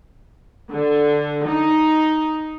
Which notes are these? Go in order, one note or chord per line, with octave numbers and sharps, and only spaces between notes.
D3
D#4